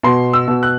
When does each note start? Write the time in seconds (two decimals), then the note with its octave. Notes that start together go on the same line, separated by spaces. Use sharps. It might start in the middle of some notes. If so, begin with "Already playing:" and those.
0.03 B2 C6
0.33 E6
0.48 B2
0.63 F#6